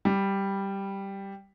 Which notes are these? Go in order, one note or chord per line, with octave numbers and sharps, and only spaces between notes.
G3